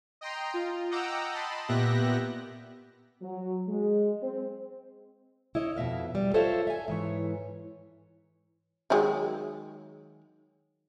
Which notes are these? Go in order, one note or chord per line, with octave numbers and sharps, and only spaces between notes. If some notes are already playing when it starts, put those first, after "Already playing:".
D#5 G5 A#5 C6
F4
D#5 F#5 G5 A#5 D6 E6
D#5 A5 B5 C6
A#2 B3 G4 E5 F#6 A#6
F#3
G#3
C4
E4 C#5 D#5
F2 B2 E5 F5
G3
F4 A4 C5 C#5 E5 F5
E5 G#5
G#2 E3 C#5
D#3 F#3 G#3